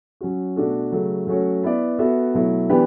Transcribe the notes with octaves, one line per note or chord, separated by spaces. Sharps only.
F#3 C#4 F#4
B2 A3 D4 F#4 A4
C#3 F#3 A3
F#3 A3 C#4 F#4 C#5
B3 E4 B4 D5
B3 F#4 A4 E5
B2 F#3 A3 E4
E3 B3 D4 G4 B4